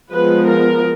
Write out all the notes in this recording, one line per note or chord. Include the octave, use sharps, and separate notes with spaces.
F3 G#3 B3 B4
A#4